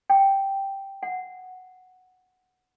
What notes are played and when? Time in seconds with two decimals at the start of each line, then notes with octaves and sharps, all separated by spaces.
0.10 G5
1.03 F#5